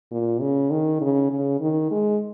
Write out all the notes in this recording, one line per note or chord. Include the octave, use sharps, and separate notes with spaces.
A#2
C#3
D#3
C#3
C#3
D#3
G#3